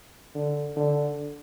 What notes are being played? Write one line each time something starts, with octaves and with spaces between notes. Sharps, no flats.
D3
D3